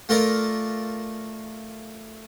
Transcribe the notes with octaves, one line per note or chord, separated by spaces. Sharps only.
A3 F4 A#4 D5